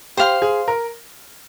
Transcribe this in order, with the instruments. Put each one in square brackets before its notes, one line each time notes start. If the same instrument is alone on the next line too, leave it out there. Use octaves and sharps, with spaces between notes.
[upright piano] G4 [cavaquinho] C5 F5 C6
[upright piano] G#4
A#4